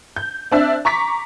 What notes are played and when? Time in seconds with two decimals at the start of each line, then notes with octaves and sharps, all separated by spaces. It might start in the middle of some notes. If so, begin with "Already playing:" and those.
0.16 G6
0.52 C4 D4 E5
0.85 A#5 C#6 D6 B6